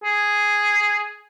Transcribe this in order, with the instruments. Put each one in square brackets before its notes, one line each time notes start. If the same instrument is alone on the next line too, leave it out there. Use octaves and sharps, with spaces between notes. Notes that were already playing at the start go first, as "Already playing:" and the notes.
[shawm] G#4